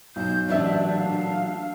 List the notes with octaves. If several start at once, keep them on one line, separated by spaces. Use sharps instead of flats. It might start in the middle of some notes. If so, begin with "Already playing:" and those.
B1 G6
A1 A#2 F#3 A3 D4 D5 E5
F5